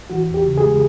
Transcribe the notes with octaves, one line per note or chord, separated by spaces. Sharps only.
E3 F#4
E2
G4
C#3
G#4
G#3